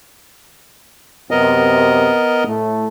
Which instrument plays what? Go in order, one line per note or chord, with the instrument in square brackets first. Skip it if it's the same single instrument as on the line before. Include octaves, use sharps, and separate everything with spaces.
[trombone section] F#2 C3 [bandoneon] B3 A#4 D#5
[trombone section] A2 A3